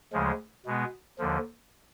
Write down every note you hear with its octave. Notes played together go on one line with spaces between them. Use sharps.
D2 C#3 F3 G#3
B2 G#3 B3
D#2 D3 F3